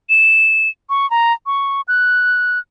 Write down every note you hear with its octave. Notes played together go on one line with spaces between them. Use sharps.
E7
C#6
A#5
C#6
F#6